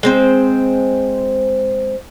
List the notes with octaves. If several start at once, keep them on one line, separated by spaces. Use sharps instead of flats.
G#3 C4 C5